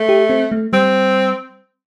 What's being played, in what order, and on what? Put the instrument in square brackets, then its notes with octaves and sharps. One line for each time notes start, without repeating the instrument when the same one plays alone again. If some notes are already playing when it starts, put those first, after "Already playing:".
Already playing: [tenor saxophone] A3
[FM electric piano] G4
C4
A3
[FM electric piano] G3 [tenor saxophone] C4